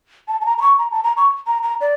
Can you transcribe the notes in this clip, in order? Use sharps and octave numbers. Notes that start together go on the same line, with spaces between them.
A5
A5
A#5
A#5
C#6
A#5
A5
A#5
C#6
A#5
A#5
D5